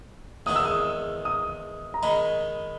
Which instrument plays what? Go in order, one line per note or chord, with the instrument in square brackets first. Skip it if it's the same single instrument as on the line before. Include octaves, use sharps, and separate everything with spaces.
[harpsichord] E2 D#3 G#3 B3 [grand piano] D#6
[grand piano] E6
D#6
D#6
A#5
[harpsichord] D#3 G#3 D#4 [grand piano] B5